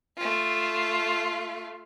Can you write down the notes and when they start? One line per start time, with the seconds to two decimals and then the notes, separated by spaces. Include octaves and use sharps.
0.17 A3 F4